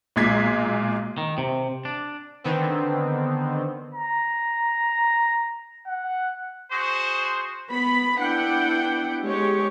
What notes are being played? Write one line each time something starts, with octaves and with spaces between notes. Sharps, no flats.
B1 A#2 G#3 G#6 B6
D#3
C3
D4
D3 D#3 B3 C4
A#5
F#5
F#4 G#4 C5
B3 B5
B3 D4 E4 F#5 G5
G#3 G4 C#5